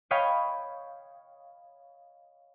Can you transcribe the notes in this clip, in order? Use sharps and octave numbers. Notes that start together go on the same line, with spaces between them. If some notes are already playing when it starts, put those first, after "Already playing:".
C#5 D#5 F5 G5 B5 G#6